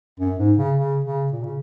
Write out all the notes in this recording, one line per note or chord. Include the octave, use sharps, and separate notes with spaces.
F#2
G#2
C#3
C#3
C#3
A#2
C#3